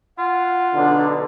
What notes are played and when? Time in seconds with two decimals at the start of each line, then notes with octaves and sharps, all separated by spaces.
0.18 F4 F#5
0.74 B1 D3 D4